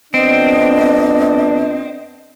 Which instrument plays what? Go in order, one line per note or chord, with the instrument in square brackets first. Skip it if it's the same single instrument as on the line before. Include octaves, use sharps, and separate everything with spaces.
[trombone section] F2 B3 D4 [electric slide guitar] C4 [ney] D#5